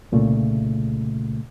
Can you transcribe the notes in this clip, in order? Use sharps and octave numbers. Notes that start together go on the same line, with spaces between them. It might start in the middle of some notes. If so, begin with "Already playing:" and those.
C2 A#2 C#3 A3